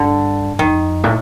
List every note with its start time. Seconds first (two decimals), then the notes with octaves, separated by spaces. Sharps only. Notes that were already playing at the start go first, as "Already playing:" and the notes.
Already playing: G2 D3
0.59 F2 D#3
1.04 A2